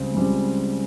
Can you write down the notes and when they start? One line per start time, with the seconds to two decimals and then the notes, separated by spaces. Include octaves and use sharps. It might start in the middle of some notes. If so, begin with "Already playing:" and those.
Already playing: C#2 C#3 G3 C4
0.14 C#2 C#3 G3 C4